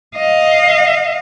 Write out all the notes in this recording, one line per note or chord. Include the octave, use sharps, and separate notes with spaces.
D#5 F5